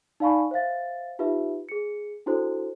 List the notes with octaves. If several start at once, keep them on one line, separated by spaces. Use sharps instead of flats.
D#4 D5 F5 G#5 B5 C#6
C5 E5 F5 A6
D#4 F4 G4 B4 E5
G#4 C#7
D4 E4 F#4 A4 C5